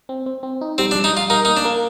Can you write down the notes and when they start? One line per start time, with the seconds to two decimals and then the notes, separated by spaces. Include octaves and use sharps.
0.09 C4
0.26 C4
0.43 C4
0.61 D#4
0.78 G3 C4
0.91 D4
0.95 G3
1.04 D#4
1.13 G3 F4
1.30 D#4 A#4
1.45 A#3 D#4
1.56 D4
1.65 A#3